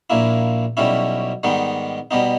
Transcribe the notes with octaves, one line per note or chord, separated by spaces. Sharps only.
A#1 A#2 A#3 E4
B1 B2 G3 C#4 E4
G#2 D#3 G3 B3 D#4
B2 G3 B3 D#4